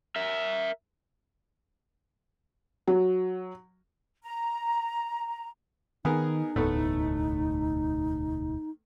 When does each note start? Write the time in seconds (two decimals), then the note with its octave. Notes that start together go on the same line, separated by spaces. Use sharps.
0.16 A#4 E5
2.88 F#3
4.24 A#5
6.05 D#3 B3 D#4 G#4 A#4
6.56 E1 D2 A2 A3 B3 A4